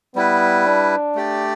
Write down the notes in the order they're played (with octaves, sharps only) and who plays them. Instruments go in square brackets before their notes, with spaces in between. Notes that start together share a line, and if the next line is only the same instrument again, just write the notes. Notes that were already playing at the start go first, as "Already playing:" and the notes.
[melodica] G3 E4 B4 [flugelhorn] B3
[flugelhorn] D4
[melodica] A3 G4 D5